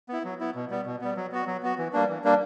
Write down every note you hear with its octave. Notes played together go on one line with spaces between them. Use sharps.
B3 E4
F#3
B3 E4
B2
G3 B3
B2
G3 B3
F#3
B3 F#4
F#3
B3 F#4
E3
G3 A#3 D4
E3
G3 A#3 D4